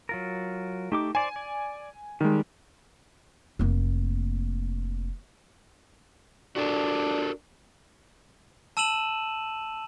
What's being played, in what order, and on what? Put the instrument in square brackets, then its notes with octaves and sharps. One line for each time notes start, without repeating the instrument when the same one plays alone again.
[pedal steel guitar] F#3 F4 A#4
[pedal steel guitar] A3 G4 D6 [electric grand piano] D#4
[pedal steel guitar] C5 D5 [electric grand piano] G#5
[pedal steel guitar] D5
[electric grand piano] D#3 G#3 [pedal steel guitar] G3
[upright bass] F1 A#3
[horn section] D4 [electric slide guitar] F#4 A4 A#4
[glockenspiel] A5 E6 D#7 E7 F#7